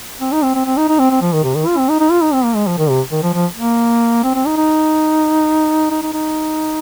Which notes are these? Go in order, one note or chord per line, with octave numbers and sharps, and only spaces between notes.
C4
D#4
C4
C4
C4
D#4
D#4
C4
C4
F3
D#3
C3
D#3
F4
C4
D#4
D#4
F4
D#4
C4
A#3
G#3
F3
D#3
C3
D#3
F3
F3
A#3
C4
C4
D#4
D#4
D#4
D#4
D#4